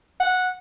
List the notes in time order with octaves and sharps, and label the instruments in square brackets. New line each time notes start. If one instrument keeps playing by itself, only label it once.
[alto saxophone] F#5